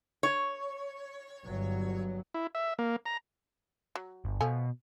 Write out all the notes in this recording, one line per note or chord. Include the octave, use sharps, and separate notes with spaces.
C#5
G1 F#3
E4
E5
A#3
A#5
F#3
G1
B2 F3 A4 G#5